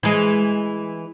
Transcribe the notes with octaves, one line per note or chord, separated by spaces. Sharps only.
E3 G#3